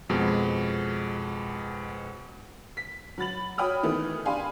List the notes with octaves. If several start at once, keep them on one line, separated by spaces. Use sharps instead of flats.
F2 B2 G#3
B6
F#3 B5 A6 F#7
F#4 C#5 G5 B5 D#6 F6
D#3 E3 A3 B3
D4 G4 F5 G#5 B5 C6